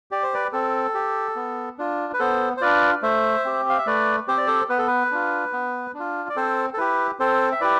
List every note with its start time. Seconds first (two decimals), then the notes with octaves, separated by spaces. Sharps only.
0.11 G4 D5
0.23 C5
0.34 B4 D5
0.53 C4 A4
0.94 G4
1.36 B3
1.78 D4 F4
2.13 B4
2.20 B3 A4 C5
2.57 C5
2.61 D4 F4 B4 D5
3.02 A3 C5 E5
3.45 C4 G4
3.69 F5
3.78 E5
3.86 A3 B4 D5
4.28 C4 G4 C5
4.38 D5
4.47 A4 C5
4.69 B3 B4
4.79 A4
4.87 B4
5.12 D4 F4
5.53 B3
5.94 D4
5.99 F4
6.29 D5
6.36 C4 A4 C5
6.74 A4
6.78 E4 G4 B4
7.20 C4 A4 C5
7.52 E5
7.61 E4 G4 B4 D5